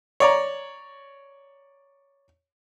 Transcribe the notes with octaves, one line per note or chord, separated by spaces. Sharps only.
C#5 D5 A#5